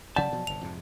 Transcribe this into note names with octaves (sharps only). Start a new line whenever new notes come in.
G2 C#3 F#3 D5 F#5 A5
B2 F3 F#3
G1 C3 F7
F2 G#2 C3